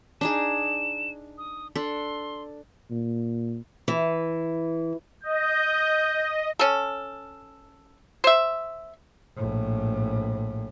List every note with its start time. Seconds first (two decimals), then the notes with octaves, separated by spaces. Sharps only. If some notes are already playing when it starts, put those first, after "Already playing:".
0.21 D4 D#4 G#4 E7
1.38 D#6
1.76 D4 A4 C6
2.91 A#2
3.88 E3
5.23 D#5 G6
6.59 C#4 A4
8.24 C5 E5
9.36 A#1 A2